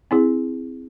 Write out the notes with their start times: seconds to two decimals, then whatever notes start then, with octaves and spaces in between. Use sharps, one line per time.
0.11 C4 E4 G#4